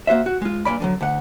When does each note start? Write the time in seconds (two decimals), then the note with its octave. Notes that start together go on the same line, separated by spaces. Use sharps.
0.07 A#3 F#4 C5 E5
0.26 F#4
0.42 G#3 F4
0.65 G2 A#2 D5 B5
0.80 D3 E3 F#3
1.01 D2 F#5